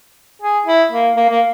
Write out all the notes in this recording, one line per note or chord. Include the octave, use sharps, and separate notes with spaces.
G#4
E4
A#3
A#3
A#3